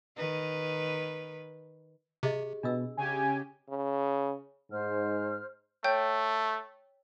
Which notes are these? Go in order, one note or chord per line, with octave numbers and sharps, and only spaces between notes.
D#3 B4
C3 G4 G#4 D#5
B2 D4 D#5 E6
C#3 G4 G#5
C#3
G#2 C5 F6
A3 C#5 G5 G6